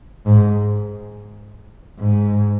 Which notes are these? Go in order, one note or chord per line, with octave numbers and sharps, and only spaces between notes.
G#2
G#2